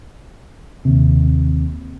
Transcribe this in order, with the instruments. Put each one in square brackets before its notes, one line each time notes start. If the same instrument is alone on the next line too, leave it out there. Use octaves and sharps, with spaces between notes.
[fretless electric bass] D#2 C3